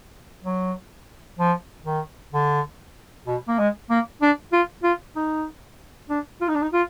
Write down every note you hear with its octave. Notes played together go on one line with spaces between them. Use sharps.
F#3
F3
D#3
D3
B2
A#3
G#3
A#3
D4
F4
F4
D#4
D4
F4
D#4
D4
D#4
F4